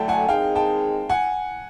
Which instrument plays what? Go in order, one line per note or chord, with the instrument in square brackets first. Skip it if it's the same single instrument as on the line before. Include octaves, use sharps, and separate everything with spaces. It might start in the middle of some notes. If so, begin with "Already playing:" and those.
Already playing: [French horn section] D3 F#3 A3 [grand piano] G5 A5
[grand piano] F#5 G#5
[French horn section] D#3 G#3 C4 D#4 G#4 [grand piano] F5 G5
[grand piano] G5 A5
F#5 G#5